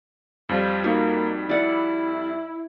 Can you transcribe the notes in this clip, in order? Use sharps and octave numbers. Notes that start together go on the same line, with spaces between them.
F2 F3 G3
A#3 D#4 F#4
E4 D5 F#5